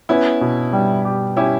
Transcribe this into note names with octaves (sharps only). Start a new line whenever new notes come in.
B3 C#4 E4
B2
G3
G4
C#4 E4 G4